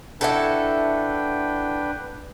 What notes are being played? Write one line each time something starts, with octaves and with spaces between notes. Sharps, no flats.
D4 E4 F#4 A4 B4 G5